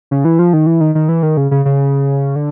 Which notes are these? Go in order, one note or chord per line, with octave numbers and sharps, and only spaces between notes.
C#3
E3
F3
D#3
E3
D#3
D#3
E3
D#3
C#3
C#3
C#3
D3